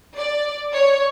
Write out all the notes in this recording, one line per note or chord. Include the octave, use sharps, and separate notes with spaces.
D5
C#5